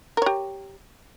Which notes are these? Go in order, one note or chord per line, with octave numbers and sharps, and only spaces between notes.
G4 A#4 C#5